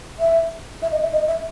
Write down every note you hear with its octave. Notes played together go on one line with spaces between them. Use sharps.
E5
E5
D#5
E5
D#5
E5